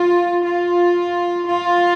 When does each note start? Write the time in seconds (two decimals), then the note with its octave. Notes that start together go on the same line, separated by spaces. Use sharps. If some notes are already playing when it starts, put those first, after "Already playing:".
Already playing: F4
0.44 F4
1.48 F4